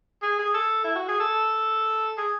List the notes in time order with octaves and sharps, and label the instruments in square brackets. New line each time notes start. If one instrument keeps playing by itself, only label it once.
[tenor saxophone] G#4
G#4
A4
E4
F#4
G#4
A4
G#4